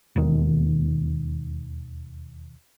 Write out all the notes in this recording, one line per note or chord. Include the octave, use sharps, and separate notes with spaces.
E1 D#2 D#3